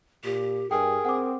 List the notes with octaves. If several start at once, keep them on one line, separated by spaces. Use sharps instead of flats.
A#2 G4
G2 G#4 A#4 G5
C4 F#5 G5 D6